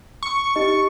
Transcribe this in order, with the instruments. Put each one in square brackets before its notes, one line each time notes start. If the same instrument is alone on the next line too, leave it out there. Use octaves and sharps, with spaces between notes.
[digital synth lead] C#6
[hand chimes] D#4 G4 D#5